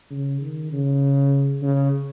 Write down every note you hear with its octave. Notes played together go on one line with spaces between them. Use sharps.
C#3
D#3
C#3
C#3